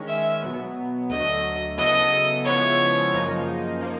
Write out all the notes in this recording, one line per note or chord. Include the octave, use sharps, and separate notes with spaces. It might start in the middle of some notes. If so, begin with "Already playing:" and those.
Already playing: D#3 G#3 C#4
E5
B2 F#3 B3
D2 D3 F#3 A3 D#5
C#3 F#3 B3 E4 A4 D#5
C#3 F3 G#3 B3 E4 C#5
F#2 C#3 F3 A#3 D#4
F3 A#3 D#4